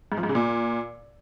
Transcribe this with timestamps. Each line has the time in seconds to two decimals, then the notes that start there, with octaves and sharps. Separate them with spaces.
0.12 G#2
0.17 F3
0.23 G#2
0.29 C#3
0.35 A#2